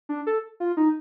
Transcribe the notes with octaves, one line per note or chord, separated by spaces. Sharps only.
D4
A4
F4
D#4